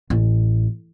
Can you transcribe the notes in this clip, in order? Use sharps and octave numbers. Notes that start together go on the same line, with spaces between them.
A1